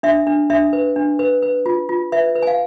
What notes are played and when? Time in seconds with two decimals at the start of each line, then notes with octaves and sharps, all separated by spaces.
0.03 D4 E5
0.27 D4
0.50 D4 E5
0.73 B4
0.96 D4
1.19 B4
1.42 B4
1.66 F4
1.89 F4
2.12 B4 E5
2.36 B4
2.42 G#5
2.47 F5